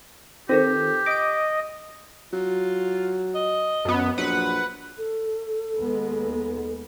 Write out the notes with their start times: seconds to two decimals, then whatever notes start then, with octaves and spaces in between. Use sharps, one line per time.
0.49 D#3 C4 F4 G4 A4 B4
1.06 D#5 D6 B6 D7
2.33 F#3 F4
3.35 D#5
3.85 F#2 B3
4.18 A#1 F#3 B4 F#5
4.98 A4
5.77 D#2 G#3 B3